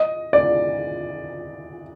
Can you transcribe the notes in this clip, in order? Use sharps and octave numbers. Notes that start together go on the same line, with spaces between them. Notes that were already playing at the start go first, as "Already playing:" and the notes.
Already playing: D#5
D5